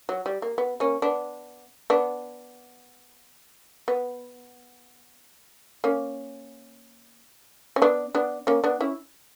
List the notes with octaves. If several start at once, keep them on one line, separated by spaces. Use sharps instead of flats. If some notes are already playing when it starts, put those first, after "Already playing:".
F#3
G3
A#3
B3
A#3 C#4
B3 D4
B3 D4
B3
A#3 C#4
C#4
B3 D4
B3 D4
A#3 C#4
B3 D4
C#4 E4